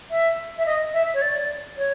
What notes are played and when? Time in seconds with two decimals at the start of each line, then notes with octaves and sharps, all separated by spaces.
0.11 E5
0.58 E5
0.66 D#5
0.94 E5
1.14 C#5
1.22 D5
1.78 C#5